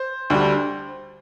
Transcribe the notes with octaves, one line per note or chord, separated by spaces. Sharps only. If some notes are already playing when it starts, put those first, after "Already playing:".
Already playing: C5
D2 D3 G3